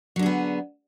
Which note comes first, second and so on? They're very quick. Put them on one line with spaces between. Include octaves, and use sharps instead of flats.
F#3 D3 G#4 B3